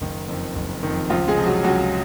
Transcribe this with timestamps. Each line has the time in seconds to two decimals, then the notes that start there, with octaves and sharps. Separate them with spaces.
0.01 F#1 D#3 D#4
0.28 F2 D#3
0.55 F#1
0.83 F2 D#3
1.10 C#2 F3 F4
1.27 G#3 G#4
1.37 C3 F3
1.45 F#3 F#4
1.64 C#2 F#3 F#4